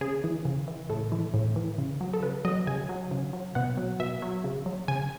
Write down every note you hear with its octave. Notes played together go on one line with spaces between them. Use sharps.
C#3 G#4
E3
C#3
E3
A2 A4
E3
A2
E3
C#3
F#3
A4
C#3 B4
F#3 D#5
C#3 G#5
F#3
C#3
F#3
B2 F#5
F#3
B2 E5
F#3
C#3
F#3
C#3 G#5